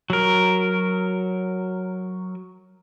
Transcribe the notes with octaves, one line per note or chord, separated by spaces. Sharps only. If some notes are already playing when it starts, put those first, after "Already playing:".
F#3 A#4